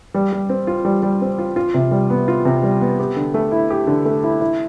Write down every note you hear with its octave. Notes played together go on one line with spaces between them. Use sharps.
G3
G3
C4
F4
G3
G3
C4
F4
F4
C3
G3
B3
F4
C3
G3
B3
G4
D3
A3
E4
G4
D3
A3
E4
E4